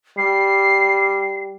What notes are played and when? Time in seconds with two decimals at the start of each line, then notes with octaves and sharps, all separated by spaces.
0.17 G3 C7